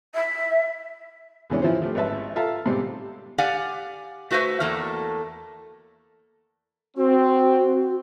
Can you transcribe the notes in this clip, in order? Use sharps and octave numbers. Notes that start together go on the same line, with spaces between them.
E5
E2 C3 E3 G#3 C#4 D4
E3 F3 E4 F4 C5
F3 A3 G4
G#1 C#4 B4 E5 A5
F4 A4 E5 F5 A5 A#5
G#2 B2 G3 C4 G4
G4 D5 F5 F#5 G#5
A3 F#4 B4 C5 E5
E2 A3 A#3 E5
C4 F#4